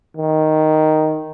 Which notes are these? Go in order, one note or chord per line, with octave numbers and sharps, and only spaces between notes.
D#3